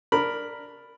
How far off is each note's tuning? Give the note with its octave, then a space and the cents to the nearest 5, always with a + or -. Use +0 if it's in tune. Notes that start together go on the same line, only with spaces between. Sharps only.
D4 +0 A#4 +0 B5 +0